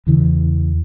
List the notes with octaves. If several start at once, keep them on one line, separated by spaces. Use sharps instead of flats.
E2 C#3 E3